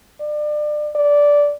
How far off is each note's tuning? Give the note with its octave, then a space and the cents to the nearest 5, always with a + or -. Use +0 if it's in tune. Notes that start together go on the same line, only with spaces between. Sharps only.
D5 +30
D5 -10